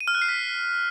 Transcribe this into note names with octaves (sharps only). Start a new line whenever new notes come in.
D#7
F6
F#6
C7
B6